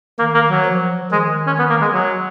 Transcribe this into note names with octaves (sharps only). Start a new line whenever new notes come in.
D#3 A#3
A#3
F#3
F3
D#3 G#3
C#4
B3
A#3
G#3
F#3